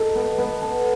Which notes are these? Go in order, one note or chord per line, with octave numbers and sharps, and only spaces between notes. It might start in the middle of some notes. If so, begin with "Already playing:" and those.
Already playing: D#4 A4
B3
B3
A4